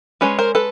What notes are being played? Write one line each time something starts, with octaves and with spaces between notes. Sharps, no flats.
G#3 C#4 B4 C#5
A#4 C5
A4 B4